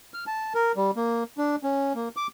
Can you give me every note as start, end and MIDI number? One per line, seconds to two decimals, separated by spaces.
0.14 0.25 89
0.27 0.53 81
0.55 0.72 70
0.76 0.91 55
0.96 1.24 58
1.38 1.56 62
1.63 1.93 61
1.95 2.09 58
2.16 2.27 86